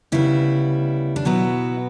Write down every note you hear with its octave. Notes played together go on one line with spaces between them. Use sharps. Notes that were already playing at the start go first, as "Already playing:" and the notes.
D2 C#3 G3 B3 E4
D4
B2 F#3 B3 E4